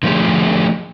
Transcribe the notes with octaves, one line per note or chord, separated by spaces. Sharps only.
D3 F3 A3 G4 G#4